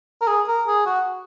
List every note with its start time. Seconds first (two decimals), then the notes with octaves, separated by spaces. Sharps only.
0.21 A#4
0.27 G#4
0.48 A#4
0.67 G#4
0.86 F#4